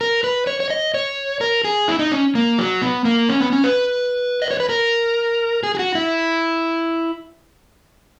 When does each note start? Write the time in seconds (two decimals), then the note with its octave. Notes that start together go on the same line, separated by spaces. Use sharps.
0.01 A#4
0.24 B4
0.47 C#5
0.60 C#5
0.70 D#5
0.94 C#5
1.41 A#4
1.64 G#4
1.88 E4
1.99 D#4
2.12 C#4
2.35 A#3
2.58 F#3
2.82 B3
3.05 A#3
3.29 C#4
3.40 B3
3.53 C#4
3.64 B4
4.42 D#5
4.51 C#5
4.60 B4
4.69 A#4
5.63 G#4
5.75 G#4
5.79 F#4
5.95 E4